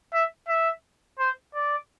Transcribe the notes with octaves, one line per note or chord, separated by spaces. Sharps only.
E5
E5
C5
D5